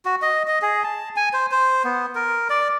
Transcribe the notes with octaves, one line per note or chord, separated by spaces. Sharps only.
F#4
D#5
D#5
G#4
A5
G#5
C5
C5
B3
A#4
D5